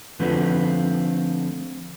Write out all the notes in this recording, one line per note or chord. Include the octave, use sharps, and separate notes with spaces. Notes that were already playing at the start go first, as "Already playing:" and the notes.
D3 F3 A3 C4 F4 B4